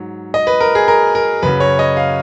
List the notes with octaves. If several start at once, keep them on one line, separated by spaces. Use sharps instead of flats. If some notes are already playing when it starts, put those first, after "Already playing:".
Already playing: G#2 F#3
D#5
B4
A#4
G#4
A#4
A#4
F#2 C#3 F#3 B4
C#5
D#5
F5